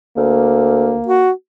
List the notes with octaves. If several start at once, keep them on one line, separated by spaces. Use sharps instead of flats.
D2 A#3
F#4